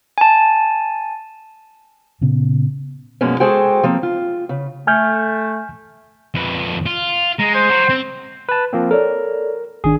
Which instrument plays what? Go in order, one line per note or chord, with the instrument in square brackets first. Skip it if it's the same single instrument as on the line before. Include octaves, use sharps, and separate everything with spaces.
[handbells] G#5 A5
[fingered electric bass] A#2 C#3 B3
[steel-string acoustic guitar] F#2 B2 F3 G#3 A#3 C#4
G#3 F#4 G#4 A4 C5 G5
F3 A#3 C4
F4
C#3
[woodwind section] A3 [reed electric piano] G#5 F6 G6
[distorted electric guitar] F2 B4
F4
[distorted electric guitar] G#3 [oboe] A#5
[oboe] C5
[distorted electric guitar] F#5 A#5
C4
[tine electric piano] B4 A5
F3 A#3 C4
[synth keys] A4 C#5 D5 [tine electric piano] A#4
[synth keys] G#1 D#3 D4 [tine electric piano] G#4